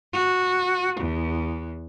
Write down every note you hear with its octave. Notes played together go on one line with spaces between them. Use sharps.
F#4
E2